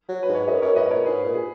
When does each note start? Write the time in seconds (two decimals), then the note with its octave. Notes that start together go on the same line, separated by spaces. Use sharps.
0.08 F#3
0.23 B4
0.29 G#2
0.35 C#5
0.47 F#2 B4 D#5
0.62 F#2 A#4 C#5
0.76 G#2 B4 D#5
0.90 A#2 A#4 C#5
1.05 G#2 G#4 B4
1.24 A#2
1.34 G#4